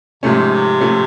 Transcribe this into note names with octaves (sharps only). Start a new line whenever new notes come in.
G#2 C3 F3 A3 C#4
F3 A3 C#4